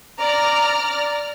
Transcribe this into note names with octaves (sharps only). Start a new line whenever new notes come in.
D5 A#5 F6